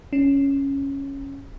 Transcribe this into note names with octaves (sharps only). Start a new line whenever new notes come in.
C#4